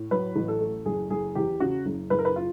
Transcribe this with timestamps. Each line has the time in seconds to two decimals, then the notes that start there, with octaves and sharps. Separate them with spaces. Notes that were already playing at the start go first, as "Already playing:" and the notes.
Already playing: A2
0.11 F#3 B4
0.36 A1
0.48 A4
0.61 A3
0.85 F#1 G#4
1.10 F#1 G#4
1.35 E2 G4
1.60 C#3 F#4
1.86 F#1
2.10 F#1 B4
2.19 A#4
2.25 B4
2.36 F4